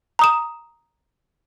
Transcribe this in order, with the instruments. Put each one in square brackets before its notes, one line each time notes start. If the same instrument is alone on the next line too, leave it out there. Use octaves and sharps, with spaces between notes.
[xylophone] A#5 D#6 E7